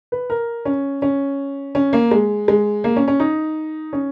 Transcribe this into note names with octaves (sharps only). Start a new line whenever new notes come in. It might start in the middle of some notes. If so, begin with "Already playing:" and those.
B4
A#4
C#4
C#4
C#4
A#3
G#3
G#3
A#3
C#4
C#4
D#4
C#4